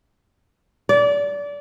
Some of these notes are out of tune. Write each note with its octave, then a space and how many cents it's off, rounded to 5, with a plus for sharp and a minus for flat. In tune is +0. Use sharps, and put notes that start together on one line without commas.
D5 -25